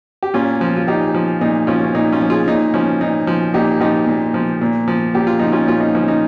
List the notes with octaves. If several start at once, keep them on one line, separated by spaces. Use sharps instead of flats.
G4
A#2 C#4 F4
F3
F4
A#2 D#4 G4
F3
A#2 D#4
F3 C#4 F4
C#4
A#2 D#4
C#4 F4
F3
F4 G#4
A#2 D#4
F3 C#4
A#2 D#4
F3
A#2 D#4 G4
F3 D#4 G4
A#2
F3
A#2
F3
A#2 G4
F4
F3 D#4
C#4 F4
A#2 C#4 F4
D#4
F3 C#4
D#4